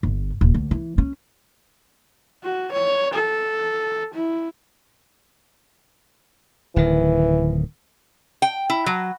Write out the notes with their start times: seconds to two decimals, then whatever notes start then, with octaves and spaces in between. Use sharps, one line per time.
0.03 G1
0.41 D#1
0.54 D2
0.71 E3
0.98 C#4
2.44 F#4
2.72 C#5
3.14 A4
4.14 E4
6.76 D1 D#3 E3
8.42 G5
8.70 E4
8.86 F#3